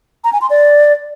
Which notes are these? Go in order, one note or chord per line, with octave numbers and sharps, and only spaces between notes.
A#5
G#5
C6
D5